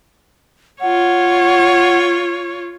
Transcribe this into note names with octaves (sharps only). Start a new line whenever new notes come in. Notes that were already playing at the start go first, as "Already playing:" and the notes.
F4 C#5 F#5